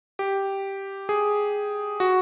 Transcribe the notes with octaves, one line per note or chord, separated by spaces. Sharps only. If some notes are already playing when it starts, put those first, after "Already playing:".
G4
G#4
F#4